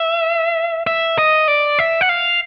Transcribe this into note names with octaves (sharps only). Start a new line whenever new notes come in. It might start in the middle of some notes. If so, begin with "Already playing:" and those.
Already playing: E5
E5
D#5
D5
E5
F#5
F5